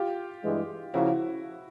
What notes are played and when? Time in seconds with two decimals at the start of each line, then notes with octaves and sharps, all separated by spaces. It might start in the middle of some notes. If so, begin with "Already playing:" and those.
Already playing: F4 G4
0.44 G2 E3 G#3
0.93 C#3 F3 A#3 E4 F#4